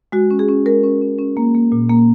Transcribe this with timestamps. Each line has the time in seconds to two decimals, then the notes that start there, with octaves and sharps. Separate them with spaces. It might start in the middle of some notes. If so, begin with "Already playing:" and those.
0.12 G#3 F#4
0.31 C#4
0.39 G#4
0.48 C#4
0.66 G#3 A#4
0.84 C#4
1.02 C#4
1.19 C#4
1.37 A#3
1.55 A#3
1.72 A#2
1.89 A#3